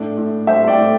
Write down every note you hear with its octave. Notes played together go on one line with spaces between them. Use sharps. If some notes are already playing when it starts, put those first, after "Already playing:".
Already playing: A2 D4
A2
G3 C5 E5
D5 G5
A2